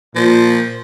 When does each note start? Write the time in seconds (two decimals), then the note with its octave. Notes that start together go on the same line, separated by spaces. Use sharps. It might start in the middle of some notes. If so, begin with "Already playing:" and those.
0.16 A#2 F3